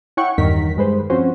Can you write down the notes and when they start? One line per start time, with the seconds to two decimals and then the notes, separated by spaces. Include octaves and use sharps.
0.17 E4 C#5 F#5 G5 C#6
0.38 E2 G2 D#3 A#4 B6
0.77 G2 G#3 B4 C5
1.10 F3 C4 C#4 F4 F#4 C5